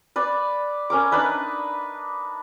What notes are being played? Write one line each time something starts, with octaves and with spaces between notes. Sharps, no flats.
B4 D5
C#4 A#4 D6
D4 D#4 B4 E5